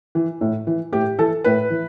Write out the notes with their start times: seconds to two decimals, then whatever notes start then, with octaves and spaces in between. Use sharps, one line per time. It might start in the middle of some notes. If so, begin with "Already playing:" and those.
0.15 E3
0.41 A2
0.67 E3
0.93 A2 G4
1.19 E3 A4
1.44 A2 B4
1.70 E3